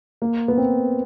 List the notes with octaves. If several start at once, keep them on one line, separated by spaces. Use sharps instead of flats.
A#3
B3
C4